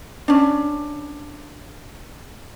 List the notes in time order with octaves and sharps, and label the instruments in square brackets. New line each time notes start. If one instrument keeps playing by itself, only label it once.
[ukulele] C#4 D4